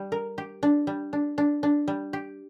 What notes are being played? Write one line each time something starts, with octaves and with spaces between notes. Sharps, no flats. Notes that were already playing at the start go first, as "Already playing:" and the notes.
Already playing: G3
A#4
G4
D4
G3
D4
D4
D4
G3
G4